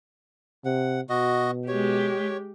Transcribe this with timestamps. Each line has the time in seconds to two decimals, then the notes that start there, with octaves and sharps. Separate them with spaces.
0.65 C3 F#5
1.09 B2 F#4 D#5
1.68 G#3 G4 C#5